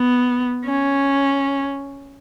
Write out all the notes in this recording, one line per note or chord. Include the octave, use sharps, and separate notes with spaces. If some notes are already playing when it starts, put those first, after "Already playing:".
Already playing: B3
C#4